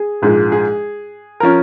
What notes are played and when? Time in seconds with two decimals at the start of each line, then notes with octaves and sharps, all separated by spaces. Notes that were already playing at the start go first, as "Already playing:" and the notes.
Already playing: G#4
0.22 A#1 G#2 F3 G#3
0.52 G#4
1.40 F3 C#4 A#4